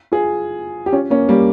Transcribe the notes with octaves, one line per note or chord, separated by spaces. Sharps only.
F4 G#4
G4
C#4 F4
A#3 C#4
G3 A#3